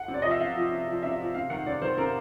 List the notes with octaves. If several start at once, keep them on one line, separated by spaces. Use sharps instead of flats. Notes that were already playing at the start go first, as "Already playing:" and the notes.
Already playing: F#5
C3
D5
F3 D#5
E5
C3 F5
F3
C3
F3
C3 E5
F3
C3 F5
D#3 F#5
C3 D5
D#3 C5
C3 A#4